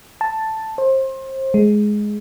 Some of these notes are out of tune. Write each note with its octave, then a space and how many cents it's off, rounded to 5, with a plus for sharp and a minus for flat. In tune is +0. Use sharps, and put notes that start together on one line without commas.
A5 +5
C5 +30
G#3 +10